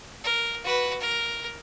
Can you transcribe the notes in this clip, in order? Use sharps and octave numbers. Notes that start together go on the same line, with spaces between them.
A#4
F#4 B4
A#4